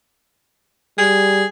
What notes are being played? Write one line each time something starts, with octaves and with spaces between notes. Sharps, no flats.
G3 G#4